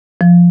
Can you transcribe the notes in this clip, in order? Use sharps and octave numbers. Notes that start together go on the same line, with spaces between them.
F3